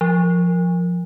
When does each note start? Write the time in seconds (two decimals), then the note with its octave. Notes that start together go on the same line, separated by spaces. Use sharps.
0.01 F3